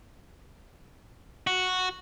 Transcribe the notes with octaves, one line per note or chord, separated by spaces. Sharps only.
F#4